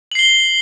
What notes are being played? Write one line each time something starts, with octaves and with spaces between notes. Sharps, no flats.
C7 F#7 G7